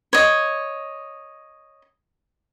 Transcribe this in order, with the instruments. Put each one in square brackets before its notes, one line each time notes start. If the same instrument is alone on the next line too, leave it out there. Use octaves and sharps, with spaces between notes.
[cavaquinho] C#5 D#5